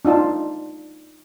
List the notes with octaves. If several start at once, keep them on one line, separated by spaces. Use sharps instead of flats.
D4 D#4 F4 A5